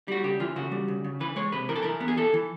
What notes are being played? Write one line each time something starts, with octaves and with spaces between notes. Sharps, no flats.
G3 F#4
C#3 G4
E3 F4
C#3 F#4
G3
C#3
C#3
E3 B4
G#3 C#5
C3 B4
E3 A#4
A4
E3 A#4
B3
G#4
E3 A4
E3